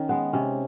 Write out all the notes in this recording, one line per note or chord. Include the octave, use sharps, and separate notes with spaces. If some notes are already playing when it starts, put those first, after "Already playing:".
Already playing: D#3 C#4
G#3 B3
C3 C#4